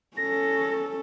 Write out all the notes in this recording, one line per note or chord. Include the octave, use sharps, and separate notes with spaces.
C#4 A4 A#6